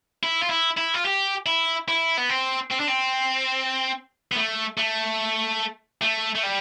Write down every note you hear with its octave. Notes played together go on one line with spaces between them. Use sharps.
E4
F4
E4
E4
F4
G4
E4
E4
B3
C4
C4
D4
C4
B3
A3
A3
A3
A3
G3